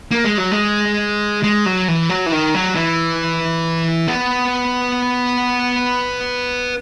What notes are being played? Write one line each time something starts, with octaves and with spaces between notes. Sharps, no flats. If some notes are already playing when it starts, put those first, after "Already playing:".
A#3
G#3
F#3
G#3
G#3
F#3
E3
F#3
E3
D#3
F#3
E3
B3